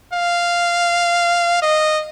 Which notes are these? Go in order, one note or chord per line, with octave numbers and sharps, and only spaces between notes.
F5
D#5